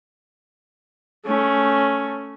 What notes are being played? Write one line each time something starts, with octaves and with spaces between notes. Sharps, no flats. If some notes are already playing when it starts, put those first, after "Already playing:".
A3 C#4